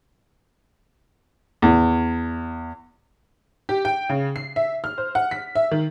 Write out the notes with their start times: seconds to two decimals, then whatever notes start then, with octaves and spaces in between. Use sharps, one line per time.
1.62 E2
3.69 G4
3.85 G5
4.09 C#3
4.36 C7
4.56 E5
4.84 F6
4.98 C5
5.15 F#5
5.31 B6
5.55 E5
5.71 D#3